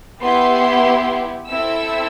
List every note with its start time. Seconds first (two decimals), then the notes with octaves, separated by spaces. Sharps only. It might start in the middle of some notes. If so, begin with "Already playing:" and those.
0.22 B3 E4 G4 C6
1.48 C4 E4 A4 E6